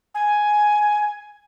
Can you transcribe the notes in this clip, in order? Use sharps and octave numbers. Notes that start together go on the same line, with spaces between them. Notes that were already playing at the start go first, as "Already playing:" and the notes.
G#5